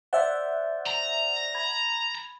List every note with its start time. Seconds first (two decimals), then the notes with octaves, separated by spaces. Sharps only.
0.13 C5 D5 E5 F#5
0.87 A#5
1.55 B5 G#6